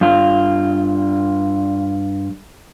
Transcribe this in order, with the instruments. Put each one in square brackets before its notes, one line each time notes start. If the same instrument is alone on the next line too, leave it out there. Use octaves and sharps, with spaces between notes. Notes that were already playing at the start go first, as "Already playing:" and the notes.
[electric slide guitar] G2 F4